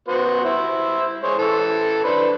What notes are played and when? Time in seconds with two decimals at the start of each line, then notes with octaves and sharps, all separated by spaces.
0.08 B3 F#4 C5
0.45 E4 C5
1.23 G#3 C5 C#5
1.39 E3 A4
2.04 D4 B4 C5